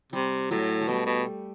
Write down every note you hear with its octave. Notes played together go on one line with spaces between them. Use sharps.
C3 G3
A2 F#3
A3
B2 G3
B2